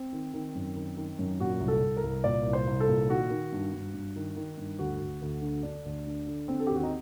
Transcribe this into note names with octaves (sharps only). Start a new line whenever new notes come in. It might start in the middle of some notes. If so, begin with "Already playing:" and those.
Already playing: C4
D#3
D#3
F#2
D#3
D#3
F#2
A#2 F#4
C2
A4
C2
A#4
C2
A#2 D5
C2
C5
C2
A4
A#2
D#3 F#4
D#3
G2
G2
G2
D#3
D#3
G2
D2 F#4
D2
D2
D3
D3 D4
D2
D3
D3
D3 C4
A4
G4
D#2
F#4
D#4